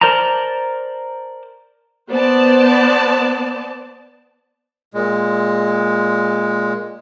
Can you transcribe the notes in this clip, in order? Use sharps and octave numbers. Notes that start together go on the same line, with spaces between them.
A#4 C5 D5 A5 A#5
B3 C5 D5 A5
A#2 G#3